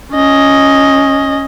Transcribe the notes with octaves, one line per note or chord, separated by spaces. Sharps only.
C#4 D#5